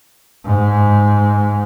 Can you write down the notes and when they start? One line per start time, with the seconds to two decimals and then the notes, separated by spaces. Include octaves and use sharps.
0.45 G#2